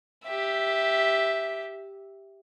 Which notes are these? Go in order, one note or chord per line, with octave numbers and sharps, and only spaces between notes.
G4 E5